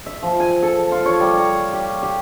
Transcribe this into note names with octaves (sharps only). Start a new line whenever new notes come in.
E5
F3
G#5
A4
F4
C#5
G3
A#5
G4
G4